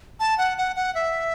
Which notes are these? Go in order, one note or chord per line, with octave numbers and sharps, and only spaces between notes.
A5
F#5
F#5
F#5
E5